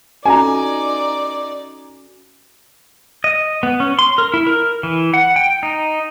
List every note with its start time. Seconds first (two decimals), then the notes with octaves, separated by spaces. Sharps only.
0.25 C#4 D#4 F#4 A4 D5 G#5 A#5
3.24 D#5
3.63 B3
3.80 C#4
3.99 C6
4.18 A#4
4.34 E4
4.47 A#4
4.83 E3
5.14 F#5
5.36 G5
5.63 D#4